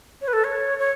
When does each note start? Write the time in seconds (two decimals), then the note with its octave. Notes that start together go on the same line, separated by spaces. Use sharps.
0.22 C#5
0.28 B4
0.33 A4
0.44 C#5
0.79 C#5